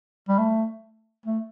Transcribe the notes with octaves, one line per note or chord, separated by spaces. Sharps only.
G3
A3
A3